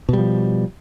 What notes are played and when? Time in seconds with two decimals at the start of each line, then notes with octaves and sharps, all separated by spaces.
0.09 B2
0.13 G3
0.18 F3